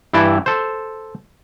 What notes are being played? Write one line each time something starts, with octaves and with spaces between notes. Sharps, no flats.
G2 E3 E4 G5 A5
A4 C5